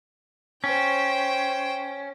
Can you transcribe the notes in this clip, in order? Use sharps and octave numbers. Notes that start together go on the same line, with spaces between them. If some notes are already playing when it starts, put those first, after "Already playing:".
C#4 C5 G5